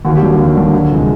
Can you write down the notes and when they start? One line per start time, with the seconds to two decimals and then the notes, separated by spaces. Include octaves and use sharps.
0.05 D#2 F#4
0.16 G4
0.22 D3 F#3
0.38 D#2
0.56 D3 F#3
0.73 D2
0.91 C3 F3 G#3